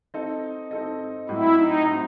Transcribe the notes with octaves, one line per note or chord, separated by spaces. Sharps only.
C4 D#4 A4 D#5
C4 D#4 A4 D#5
A2 F#3 C4 E4
D#4
A2 F#3 C4